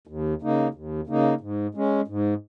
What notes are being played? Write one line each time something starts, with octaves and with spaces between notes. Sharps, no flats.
D#2
C#3 A#3 D#4
D#2
C#3 A#3 D#4
G#2
G#3 C#4
G#2